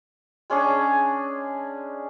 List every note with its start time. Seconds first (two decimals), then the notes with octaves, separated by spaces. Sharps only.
0.50 G#3 C#4 D4 G#4